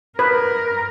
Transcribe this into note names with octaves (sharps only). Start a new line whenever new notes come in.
A#4 B4